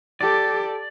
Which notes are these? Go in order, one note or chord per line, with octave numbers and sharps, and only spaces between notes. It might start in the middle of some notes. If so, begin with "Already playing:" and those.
G4 A4 D5